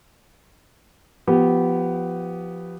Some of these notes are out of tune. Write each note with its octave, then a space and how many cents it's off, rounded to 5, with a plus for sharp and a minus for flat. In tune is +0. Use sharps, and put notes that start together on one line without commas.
F3 +0 B3 +5 G4 -15